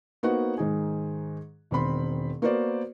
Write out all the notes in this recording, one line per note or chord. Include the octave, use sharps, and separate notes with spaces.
A#3 B3 D#4 F#4 C5 F#5
G#2 D#3 D#4 G#4
E1 D#3 C4 B5 C6
A#3 B3 F#4 A#4 C5 D5